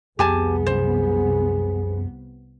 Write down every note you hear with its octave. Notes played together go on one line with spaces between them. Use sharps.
C2 F2 C3 B3 G4 G#4 G#5 A5
F#2 F3 C#4 C5